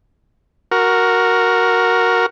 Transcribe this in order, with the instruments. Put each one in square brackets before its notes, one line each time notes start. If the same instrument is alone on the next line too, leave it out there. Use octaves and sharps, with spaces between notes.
[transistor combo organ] F#4 A#4